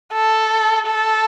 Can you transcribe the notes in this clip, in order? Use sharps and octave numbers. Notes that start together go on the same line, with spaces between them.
A4
A4